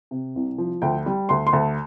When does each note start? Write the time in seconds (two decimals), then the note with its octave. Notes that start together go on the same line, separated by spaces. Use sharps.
0.11 C3
0.36 C2
0.58 F3
0.82 D2 G5
1.06 G3
1.29 D2 C6
1.47 C6
1.53 D2 A5